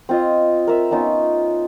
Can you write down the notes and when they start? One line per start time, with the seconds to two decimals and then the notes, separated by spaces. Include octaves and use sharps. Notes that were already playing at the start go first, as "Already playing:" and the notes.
0.09 C4 F4 D#5
0.67 A#4 E5
0.91 B3 C#4 D#4 F4